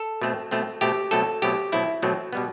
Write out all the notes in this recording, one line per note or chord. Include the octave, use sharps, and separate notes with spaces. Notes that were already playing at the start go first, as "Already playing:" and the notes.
Already playing: A4
B2 A3 C4
B2 A3 C4
B2 A3 C4 G4
B2 F#3 A3 C4 A4
B2 F#3 A3 C4 G4
B2 F#3 A3 C4 E4
B2 F#3 A3 C4
B2 G3 B3